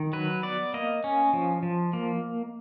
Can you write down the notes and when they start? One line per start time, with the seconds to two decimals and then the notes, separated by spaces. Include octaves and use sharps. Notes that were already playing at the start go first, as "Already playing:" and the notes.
Already playing: D#3
0.13 F#3 B4
0.43 B3 D5
0.74 A#3 D#5
1.04 C#4
1.33 F3
1.63 F3
1.93 A#3